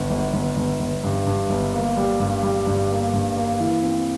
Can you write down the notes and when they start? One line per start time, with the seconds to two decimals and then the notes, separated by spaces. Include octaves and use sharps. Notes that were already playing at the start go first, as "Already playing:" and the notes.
Already playing: G1
0.10 G1
0.34 G1
0.57 G1
0.80 G1
1.04 G2
1.27 G2
1.50 G1
1.74 A#3
1.97 G3
2.20 G2
2.43 G3
2.67 G2
2.90 A#3
3.13 G2
3.36 A#3
3.60 E3
3.83 C4